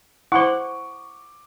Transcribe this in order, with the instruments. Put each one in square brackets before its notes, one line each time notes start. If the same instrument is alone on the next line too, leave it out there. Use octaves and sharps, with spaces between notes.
[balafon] E4 C5 [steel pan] F#5 [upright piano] C#6 D6